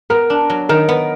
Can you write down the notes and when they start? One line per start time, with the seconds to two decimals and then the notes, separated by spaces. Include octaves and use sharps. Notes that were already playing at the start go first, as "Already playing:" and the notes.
0.10 B3 A#4
0.30 D4
0.50 F#3
0.69 D#3 A#4
0.89 B3